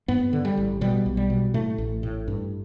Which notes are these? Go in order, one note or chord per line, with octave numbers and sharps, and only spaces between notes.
G2 B3
D3
G3
A1
B2 G3
B1
G3
B2
A2 A3
A1
A2
G2